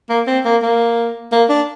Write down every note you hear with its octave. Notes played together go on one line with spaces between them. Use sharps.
A#3
C4
A#3
A#3
A#3
D4